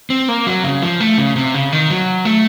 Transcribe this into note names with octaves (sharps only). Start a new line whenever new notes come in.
C4
A#3
F#3
C#3
F3
A3
C#3
C3
C#3
D#3
F#3
A3